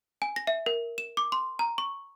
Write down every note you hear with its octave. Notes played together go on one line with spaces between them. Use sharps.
G#5
A#6
E5
A#4
E7
D6
C6
A#5
C#6